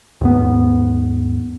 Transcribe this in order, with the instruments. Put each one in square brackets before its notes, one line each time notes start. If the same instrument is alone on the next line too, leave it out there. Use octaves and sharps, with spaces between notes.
[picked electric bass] D#2 G#2 B3